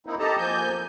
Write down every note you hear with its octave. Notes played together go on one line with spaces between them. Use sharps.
A#3 C4 D#4 E4
G4 A4 D#5 A5 A#5
F3 A#3 G#5 G6